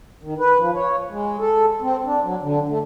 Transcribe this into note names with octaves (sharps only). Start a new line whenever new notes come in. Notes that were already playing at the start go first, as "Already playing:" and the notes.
D#3
B4
F3
C#5
G#3
A4
C4
D4
F#3
D3
A3